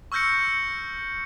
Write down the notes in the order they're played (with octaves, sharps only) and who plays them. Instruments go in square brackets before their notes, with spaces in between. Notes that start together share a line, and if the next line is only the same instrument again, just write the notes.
[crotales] C#6 E6 F6 G6 A#6 C#7